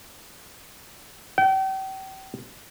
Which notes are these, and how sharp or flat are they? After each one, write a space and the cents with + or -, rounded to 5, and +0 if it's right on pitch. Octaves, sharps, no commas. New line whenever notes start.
G5 -40